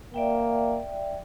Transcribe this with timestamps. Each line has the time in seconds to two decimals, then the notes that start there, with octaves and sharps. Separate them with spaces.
0.14 A#3 D5 E5 G5